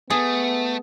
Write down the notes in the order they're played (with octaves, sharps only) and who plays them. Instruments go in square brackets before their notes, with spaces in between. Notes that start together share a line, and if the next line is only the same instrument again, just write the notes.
[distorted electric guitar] A3 [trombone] B3 [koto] G#4